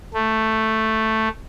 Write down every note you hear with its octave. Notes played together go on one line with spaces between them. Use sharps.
A3